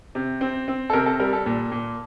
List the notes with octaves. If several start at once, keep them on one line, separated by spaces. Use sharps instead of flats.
C3
C4
C4
A4
C3 A#4
A4
G3 A#4
A4
A#2
A#2